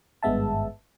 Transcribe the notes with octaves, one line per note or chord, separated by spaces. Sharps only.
G#1 G2 G#3 B3 E5 A5